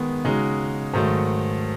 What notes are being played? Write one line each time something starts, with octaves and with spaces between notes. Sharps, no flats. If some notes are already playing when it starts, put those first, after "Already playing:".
Already playing: D#3 G#3 B3
C#3 G#3 D#4 F#4
G#2 D#3 F#3 A3